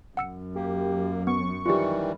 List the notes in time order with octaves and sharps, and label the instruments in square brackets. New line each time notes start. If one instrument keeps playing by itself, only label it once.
[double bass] F#2 [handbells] F#5 E6 C#7
[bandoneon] A#3 [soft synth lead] G4
[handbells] B3 [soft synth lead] C#6
[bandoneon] D#3 E3 G3 [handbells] F4 G4